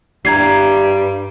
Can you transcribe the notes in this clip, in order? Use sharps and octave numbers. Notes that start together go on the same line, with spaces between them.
G2 G3 D4 E4 G4 A#5 G#6 C7